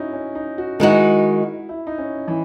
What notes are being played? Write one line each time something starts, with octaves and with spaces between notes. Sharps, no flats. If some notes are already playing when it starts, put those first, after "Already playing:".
Already playing: C#4 D#4 E4 F#4
C#4
D#4
F#4
D#3 G#3 D#4 E4 F#4
E4
D#4
C#4
E3